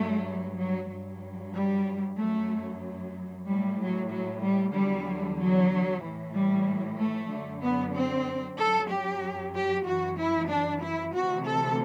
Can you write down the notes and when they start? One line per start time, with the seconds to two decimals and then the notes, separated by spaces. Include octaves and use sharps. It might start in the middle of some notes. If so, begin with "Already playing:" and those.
Already playing: G2 F#3 A3
0.57 F#3
0.89 G2 F#3
1.54 G3
2.17 F#2 F#3 A3
3.45 A2 F#3 G3
3.78 F#3
4.09 F#3
4.41 G3
4.73 E2 D3 F#3 G3
5.38 F#3
6.01 A2 E3
6.33 G3
6.97 A3
7.29 F#2 D3 F#3
7.62 B3
7.94 C4
8.58 F#2 F#3 A4
8.90 G4
9.54 G4
9.86 F#2 E3 F#4
10.18 E4
10.49 D4
10.82 E4
11.14 D2 C3 E3 F#4
11.46 A4